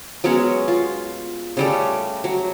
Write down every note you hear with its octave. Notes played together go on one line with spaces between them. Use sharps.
F#3 G#3 B3 C#4
F4
C#3 G3 A3
F#3